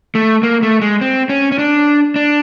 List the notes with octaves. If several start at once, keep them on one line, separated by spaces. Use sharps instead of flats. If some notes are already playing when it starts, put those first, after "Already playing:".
A3
A#3
A3
G#3
C4
C#4
C#4
D4
D4